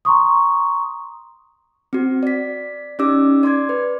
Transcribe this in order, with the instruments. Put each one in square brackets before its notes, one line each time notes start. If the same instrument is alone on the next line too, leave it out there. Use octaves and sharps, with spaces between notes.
[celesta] A#5 C6 C#6 D#6
[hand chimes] C4 F#4
D5 B6
C#4 D#4 G4 D5 D6 E6
D5 C6 D6 G#6
B4